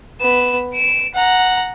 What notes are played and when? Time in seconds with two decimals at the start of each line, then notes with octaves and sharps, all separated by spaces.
0.21 B3 E7
0.74 D7 E7
1.15 F#5 A#5